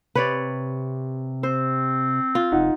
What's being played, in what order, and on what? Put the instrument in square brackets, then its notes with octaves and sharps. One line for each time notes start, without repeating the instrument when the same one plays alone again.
[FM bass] C3 [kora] B4 C#5 D5
[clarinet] C4 [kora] C5
[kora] F4
[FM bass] F1 [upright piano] D#4 F#5